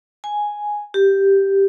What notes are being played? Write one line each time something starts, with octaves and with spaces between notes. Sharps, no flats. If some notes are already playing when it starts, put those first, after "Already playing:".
G#5
G4